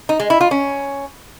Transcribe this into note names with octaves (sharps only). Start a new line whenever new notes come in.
D#4
G#3
E4
F4
C#4